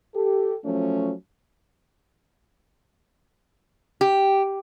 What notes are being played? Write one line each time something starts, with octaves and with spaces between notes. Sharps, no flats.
G4 A4
F3 F#3 A3 C#4
G4